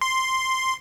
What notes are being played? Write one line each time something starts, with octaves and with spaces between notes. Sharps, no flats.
C6